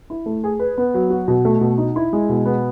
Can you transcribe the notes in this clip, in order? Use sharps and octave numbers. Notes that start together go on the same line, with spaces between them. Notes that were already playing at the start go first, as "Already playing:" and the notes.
E4
A3
G#4
B4
B3
F#3
F#4
B2
A3
B2
D#4
E4
G#3
B2
B3